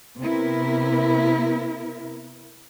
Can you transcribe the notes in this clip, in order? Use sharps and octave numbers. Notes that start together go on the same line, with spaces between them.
C3 B3 E4 A#4